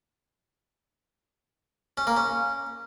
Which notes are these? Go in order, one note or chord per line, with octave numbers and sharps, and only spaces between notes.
C#4
A#3
C#4